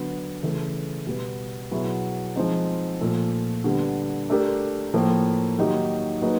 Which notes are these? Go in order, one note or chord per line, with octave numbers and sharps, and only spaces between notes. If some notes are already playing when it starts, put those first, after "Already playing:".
Already playing: D3 F#3 B3
C#3 E3 A3
B2 G3 B3
B2 F#3 B3 E4 G#4
F3 G#3 C4 D#4
A#2 F3 A3
D3 G3 B3
A3 D4 G4 A#4
A2 F3 A#3
D#3 F#3 A#3 D#4 G4
F#3 A#3 D#4 G#4 B4